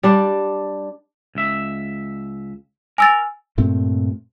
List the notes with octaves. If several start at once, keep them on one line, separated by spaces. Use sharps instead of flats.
G3 D4
C#2 E5
A#4 G#5 E6 A6
G2 A#2 A3 C4